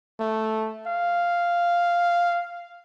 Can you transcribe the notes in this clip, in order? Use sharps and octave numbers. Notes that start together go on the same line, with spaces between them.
A3
F5